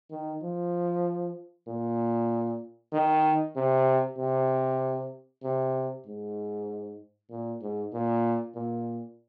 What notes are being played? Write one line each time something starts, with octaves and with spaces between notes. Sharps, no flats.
D#3
F3
A#2
D#3
C3
C3
C3
G#2
A#2
G#2
A#2
A#2